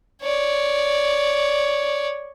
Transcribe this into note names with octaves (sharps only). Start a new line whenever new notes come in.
C#5 D5